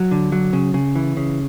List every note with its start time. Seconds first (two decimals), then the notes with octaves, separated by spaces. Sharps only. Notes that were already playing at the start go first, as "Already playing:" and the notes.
Already playing: F#3
0.11 D3
0.32 F#3
0.53 C#3
0.74 C#3
0.95 E3
1.17 C#3